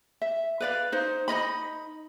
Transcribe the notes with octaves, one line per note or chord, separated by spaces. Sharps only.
E5
B4 D5 F5
D#4 C5
D#4 C#5 D#5 B5